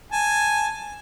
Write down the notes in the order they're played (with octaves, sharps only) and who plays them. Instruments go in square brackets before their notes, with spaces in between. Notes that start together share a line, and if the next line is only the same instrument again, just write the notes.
[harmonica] G#5 A5